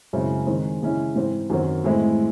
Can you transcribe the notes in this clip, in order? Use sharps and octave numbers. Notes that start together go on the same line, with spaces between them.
F#2 C#3 G#3 C4 E4
D#3 G#3 C4
C#3 E3 G#3 C#4 E4
G#2 E3 C4
F#2 D#3 F#3 C4
A2 E3 G#3 C4 E4